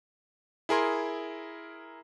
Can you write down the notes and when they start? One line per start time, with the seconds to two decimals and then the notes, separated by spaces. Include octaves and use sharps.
0.69 E4 G#4 A#4 C6